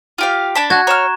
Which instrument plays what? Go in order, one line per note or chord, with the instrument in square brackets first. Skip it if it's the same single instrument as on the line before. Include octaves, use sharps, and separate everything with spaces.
[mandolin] F4 G4 F5
D4 A5 B5
[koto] F#4 [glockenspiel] F#6 G#6
[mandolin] C#5 F6 [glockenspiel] A#5 C#6 E7